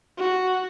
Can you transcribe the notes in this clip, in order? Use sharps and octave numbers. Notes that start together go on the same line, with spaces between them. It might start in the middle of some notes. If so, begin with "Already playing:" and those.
F#4